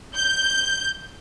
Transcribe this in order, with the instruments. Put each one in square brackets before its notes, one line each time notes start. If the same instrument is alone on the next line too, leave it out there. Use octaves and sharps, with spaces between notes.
[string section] G6